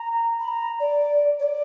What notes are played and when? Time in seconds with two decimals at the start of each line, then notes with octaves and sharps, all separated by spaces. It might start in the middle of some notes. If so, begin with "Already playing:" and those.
Already playing: A#5
0.40 B5
0.48 A#5
0.79 D5
1.39 C#5
1.43 D5